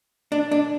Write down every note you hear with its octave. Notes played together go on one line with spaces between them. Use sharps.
D4
D4